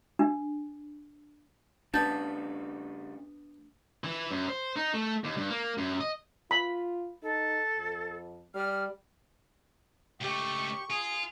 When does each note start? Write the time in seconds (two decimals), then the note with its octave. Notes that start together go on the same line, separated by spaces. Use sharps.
0.19 D4
1.94 C#3 G3 B3 D4 A5 B5 G6 A6
4.04 E3
4.31 F#2
4.48 C5
4.76 D#4
4.94 A3
5.24 D#2
5.37 G2
5.50 A#3
5.78 F#2
6.00 D#5
6.51 F4 B5
7.23 D#4 A4
7.77 F2
8.55 G3 F6
10.21 C#2 A3 G4 C#6
10.90 F4 G#4